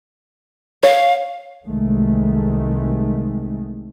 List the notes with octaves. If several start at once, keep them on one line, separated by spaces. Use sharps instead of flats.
C#5 F5
C2 C3 D#3 G#3 A3